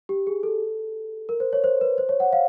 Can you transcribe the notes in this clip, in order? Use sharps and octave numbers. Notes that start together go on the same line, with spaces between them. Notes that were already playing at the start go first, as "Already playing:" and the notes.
G4
G#4
A4
A#4
C5
C#5
C5
B4
C5
C#5
F#5
F5